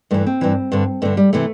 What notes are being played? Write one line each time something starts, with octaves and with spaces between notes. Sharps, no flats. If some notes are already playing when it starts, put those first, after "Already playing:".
G2 E3 A3
C4
G2 E3
G2 D3
G2 D3 A3
G3
C3 E3 A3